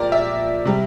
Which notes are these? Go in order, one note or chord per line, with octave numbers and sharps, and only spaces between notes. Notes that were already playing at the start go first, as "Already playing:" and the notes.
Already playing: A#2 F3 G4 A#4 D5
E5
C3 G3